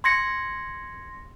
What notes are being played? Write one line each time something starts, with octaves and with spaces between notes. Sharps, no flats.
C6 G#6 A#6 C#7